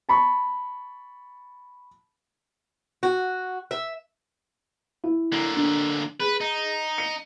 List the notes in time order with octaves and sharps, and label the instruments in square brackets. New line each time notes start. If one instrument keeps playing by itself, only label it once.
[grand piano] A5 B5 C#6
[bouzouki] F#4
E5
[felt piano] E4
[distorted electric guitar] D3 A#3
[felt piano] D4
[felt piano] G#4 [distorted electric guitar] B4
[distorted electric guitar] D#4
[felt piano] C#7